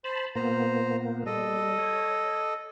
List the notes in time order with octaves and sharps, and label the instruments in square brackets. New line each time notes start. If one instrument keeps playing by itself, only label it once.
[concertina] C5 [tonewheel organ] A5 B5
[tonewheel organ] A#2 A#3 B3 [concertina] C5 A#5
[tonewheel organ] G3 [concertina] A4 D#5
[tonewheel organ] C#5